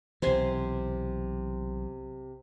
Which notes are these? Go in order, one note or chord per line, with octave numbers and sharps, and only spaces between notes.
B1 C3 E3 C5 G#5 C6